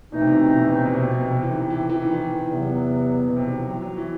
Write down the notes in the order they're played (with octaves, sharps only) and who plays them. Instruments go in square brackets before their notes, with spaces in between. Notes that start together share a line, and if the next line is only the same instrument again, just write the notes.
[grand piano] B2 [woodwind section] E3 A3 C4 D#4
[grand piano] C3
B2
C3
B2
C3
B2
C3
B2
C3
B2
C3
B2
C3
E3
D#3
E3
E3
D#3
E3
[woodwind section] E2 C3 F#3 B3
[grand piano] B2
C3
D#3
E3
F#3
F#3
E3